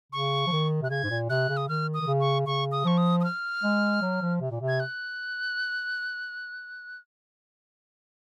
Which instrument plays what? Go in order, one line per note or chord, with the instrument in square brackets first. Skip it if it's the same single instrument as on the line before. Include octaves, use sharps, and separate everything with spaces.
[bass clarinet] C#3 [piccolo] C#6
[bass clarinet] F3
D#3
[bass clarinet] C3 [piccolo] F#6
[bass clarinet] C#3 [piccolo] G#6
[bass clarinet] G#2
A#2
[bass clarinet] C3 [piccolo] F#6
[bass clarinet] C#3
[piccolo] D#6
[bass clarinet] D#3 [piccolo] F6
[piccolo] D#6
[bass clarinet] D#3
C#3
[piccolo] C#6
[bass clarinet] C#3 [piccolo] C#6
[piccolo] D#6
[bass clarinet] F3 [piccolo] C#6
[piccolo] D#6
D#6
F6
[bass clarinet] G#3
F#3
F3
C3
A#2
C3
[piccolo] G#6
F#6